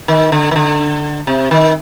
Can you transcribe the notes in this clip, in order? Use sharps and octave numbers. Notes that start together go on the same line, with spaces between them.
D#3
D3
D#3
D3
C3
D#3